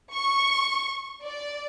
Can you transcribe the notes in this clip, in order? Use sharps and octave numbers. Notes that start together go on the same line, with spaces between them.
C#6
D5